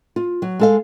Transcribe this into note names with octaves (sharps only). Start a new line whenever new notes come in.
F4
F#3
G#3 A4 F5